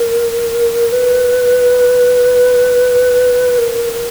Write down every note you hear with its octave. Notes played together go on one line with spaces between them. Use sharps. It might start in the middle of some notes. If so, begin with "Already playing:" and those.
Already playing: A#4
B4
A#4